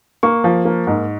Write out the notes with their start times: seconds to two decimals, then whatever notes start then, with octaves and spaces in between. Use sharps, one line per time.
0.23 A#3 C#6
0.44 F3
0.65 A#3
0.87 G#2